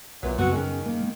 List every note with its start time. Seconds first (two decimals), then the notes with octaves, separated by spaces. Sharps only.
0.23 B1 A#2 E3 F#3 B3 B4
0.38 F#2 C#3 B3 C4 F#4
0.52 D#3 C#4 G#4
0.86 A#3
1.01 G#3 B3